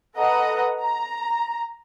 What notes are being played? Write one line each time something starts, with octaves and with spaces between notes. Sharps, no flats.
A4 B4 D#5 F#5 A#5
A#5